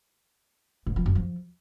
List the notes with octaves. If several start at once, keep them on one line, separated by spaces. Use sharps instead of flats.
G#2
F3
F#2
F3